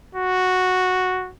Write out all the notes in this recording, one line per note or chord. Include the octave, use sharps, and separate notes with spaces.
F#4